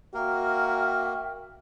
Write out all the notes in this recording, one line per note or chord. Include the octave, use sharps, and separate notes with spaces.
A#3 F#4 A#4 E5 G5 F6